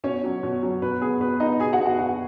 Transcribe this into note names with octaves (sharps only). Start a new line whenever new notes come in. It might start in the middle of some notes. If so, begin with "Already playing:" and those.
B2 C#4 C#5
F#3 C#4
B2
F#3 C#4
B2 B4
B3 G#4
B2 B4
B3 D#4 D#5
B2 G#4 G#5
F#4 F#5
B3
F#4 F#5
B2 F#4 F#5